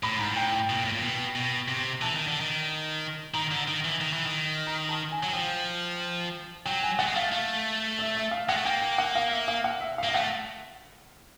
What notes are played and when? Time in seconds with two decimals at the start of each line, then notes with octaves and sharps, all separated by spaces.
0.03 A2 B5
0.16 G#2 A#5
0.31 A2
0.36 G5
0.52 G5
0.69 B2
0.77 A#2
0.84 A2
0.92 A#2
1.02 B2
1.35 B2
1.68 C3
2.01 E3 A5
2.15 D#3
2.27 D3
2.40 D#3
3.34 D#3 A#5
3.51 D3
3.68 D#3
3.84 E3
4.01 D#3
4.13 E3
4.26 D#3
4.67 A#5
4.89 A5
5.12 G#5
5.23 F#3
5.33 F3 G5
6.66 F#3 G5
6.83 G#5
6.99 A3 F#5
7.07 G#3
7.15 A3 F5
7.32 A3
7.99 E5
8.15 E5
8.31 F5
8.49 G#3 F#5
8.57 A3
8.65 A#3 G5
8.82 G5
8.98 F#5
9.15 F5
9.31 E5
9.48 F5
9.64 F#5
9.81 E5
9.98 F5
10.03 A#3
10.09 F5
10.15 A3 F#5